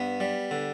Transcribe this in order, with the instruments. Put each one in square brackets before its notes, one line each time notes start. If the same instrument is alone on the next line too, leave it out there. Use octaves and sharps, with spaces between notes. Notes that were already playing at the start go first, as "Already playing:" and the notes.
Already playing: [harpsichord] G2 B3
G3
D3